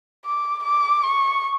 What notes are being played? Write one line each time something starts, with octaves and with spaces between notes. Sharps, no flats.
D6
D6
C#6